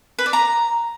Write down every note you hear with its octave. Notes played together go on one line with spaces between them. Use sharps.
B4
D5
A#5